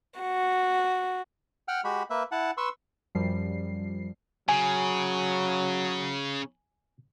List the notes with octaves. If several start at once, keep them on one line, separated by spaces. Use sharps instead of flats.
F#4
F#5 G5 F6
G#3 F#4 G4 B5
A#3 B4 E5
E4 F#5 A5
B4 C6 C#6 E6
F#2 F3 G3 C7
C#3 F#3 G#5